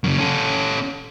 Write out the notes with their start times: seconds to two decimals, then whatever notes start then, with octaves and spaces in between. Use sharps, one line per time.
0.04 F#2 C#3
0.18 C#4 A4